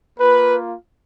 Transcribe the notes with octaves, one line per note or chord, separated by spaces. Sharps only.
A#3 F4 B4